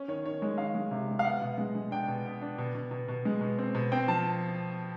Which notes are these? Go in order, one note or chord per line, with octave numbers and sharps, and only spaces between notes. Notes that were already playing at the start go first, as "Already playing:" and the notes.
Already playing: C#4
D#3 C#5
D#3 C#5
G#3 C#5
D#3 F5
G#3
C3
G#3
F5
B3 F#5
B2
G#3
G#3
D4 G5
B2
B3
D4
B2
B2
B2
B2
G#3
B2
C4
B2
C4 G5
F3 A5